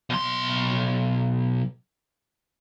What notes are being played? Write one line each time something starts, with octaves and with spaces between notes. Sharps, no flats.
B1 C6